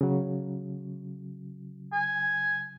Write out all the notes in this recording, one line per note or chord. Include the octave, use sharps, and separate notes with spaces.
C#3 F#3
G#5